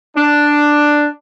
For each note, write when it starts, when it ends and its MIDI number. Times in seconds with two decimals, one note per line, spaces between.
0.17 1.07 62